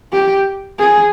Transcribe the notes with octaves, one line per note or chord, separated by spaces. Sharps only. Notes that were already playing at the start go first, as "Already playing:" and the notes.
G4
G#4